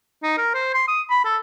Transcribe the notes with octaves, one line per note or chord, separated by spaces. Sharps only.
D#4
A#4
C5
C6
D#6
B5
A4